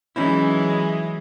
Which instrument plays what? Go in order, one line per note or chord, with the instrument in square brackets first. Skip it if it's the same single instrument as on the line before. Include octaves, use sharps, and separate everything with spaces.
[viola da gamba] E3 F#3 G#3 [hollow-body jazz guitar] C#4 D#4 E4